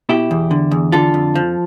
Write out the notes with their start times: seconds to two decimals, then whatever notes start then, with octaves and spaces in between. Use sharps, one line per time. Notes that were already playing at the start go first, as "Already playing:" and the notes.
0.09 B2 E4 G4
0.31 E2
0.51 D3
0.71 E2
0.92 D3 F4 A4
1.14 F2
1.35 F3